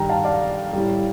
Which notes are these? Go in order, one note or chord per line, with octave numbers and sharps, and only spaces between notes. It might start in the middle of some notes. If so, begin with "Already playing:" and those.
Already playing: G2 D#3 G3 G5 A#5
F5 A5
D5 F5
A2 G3